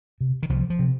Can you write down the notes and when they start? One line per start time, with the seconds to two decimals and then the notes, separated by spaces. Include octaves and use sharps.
0.20 C3
0.43 D#3
0.49 C2 F3
0.70 F3
0.79 C3